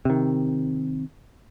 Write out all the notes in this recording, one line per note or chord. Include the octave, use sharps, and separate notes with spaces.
C3 D#3